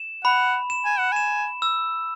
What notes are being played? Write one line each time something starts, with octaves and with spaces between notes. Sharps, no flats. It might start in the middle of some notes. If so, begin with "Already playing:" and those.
Already playing: E7
F#5 B5
E7
G#5
F#5
G#5 E7
E6